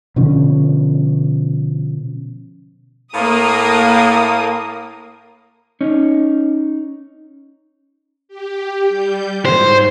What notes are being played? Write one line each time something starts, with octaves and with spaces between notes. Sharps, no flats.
B2 D3 F3 C#4
A2 A#3 F5 D#6
C#4 D#4
G4
G3 G6
G#2 C5 C#5